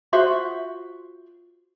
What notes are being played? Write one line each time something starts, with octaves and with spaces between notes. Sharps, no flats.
F4 F#4 C5 E5